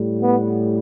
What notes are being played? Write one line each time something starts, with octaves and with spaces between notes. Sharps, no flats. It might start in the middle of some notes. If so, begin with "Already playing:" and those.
Already playing: A2 G3
B3